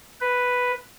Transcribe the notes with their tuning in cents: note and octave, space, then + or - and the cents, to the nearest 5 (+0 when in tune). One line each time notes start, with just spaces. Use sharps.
B4 +0